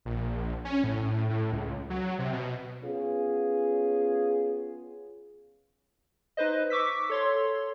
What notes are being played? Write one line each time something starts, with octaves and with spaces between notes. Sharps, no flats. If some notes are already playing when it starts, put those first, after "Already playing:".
A#1
C#4
A2
A2
C#2
F#3
C3
B2
B3 C#4 F4 G#4
D#4 B4 C5 D#5
C#6 D6 E6 B6
A4 C#5 C6